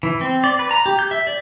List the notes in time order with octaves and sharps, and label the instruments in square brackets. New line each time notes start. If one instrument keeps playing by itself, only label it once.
[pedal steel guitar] E3
C4
D5
B4
A#5
G4
G6
E5
D5